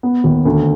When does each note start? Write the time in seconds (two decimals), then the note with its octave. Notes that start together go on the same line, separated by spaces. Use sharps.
0.03 B3
0.24 D#2
0.45 D2